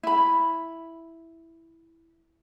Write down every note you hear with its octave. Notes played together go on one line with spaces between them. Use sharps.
E4 B5